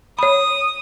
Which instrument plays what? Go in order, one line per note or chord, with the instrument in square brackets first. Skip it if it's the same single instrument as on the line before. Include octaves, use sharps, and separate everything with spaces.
[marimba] C#5 B5 [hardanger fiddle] D#6